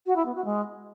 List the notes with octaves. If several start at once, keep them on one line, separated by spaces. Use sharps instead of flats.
F#4
E4
B3
F#4
G#3